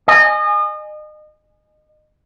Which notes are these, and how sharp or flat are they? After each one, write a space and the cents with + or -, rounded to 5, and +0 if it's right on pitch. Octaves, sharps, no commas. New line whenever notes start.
D#5 -30 G#5 +0